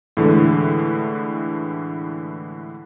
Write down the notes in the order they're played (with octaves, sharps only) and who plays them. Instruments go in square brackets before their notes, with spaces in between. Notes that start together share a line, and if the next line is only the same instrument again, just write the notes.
[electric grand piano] A2 D3 E3 G#3